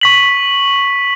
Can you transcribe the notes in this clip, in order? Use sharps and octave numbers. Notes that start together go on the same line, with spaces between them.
C#6 B6 F#7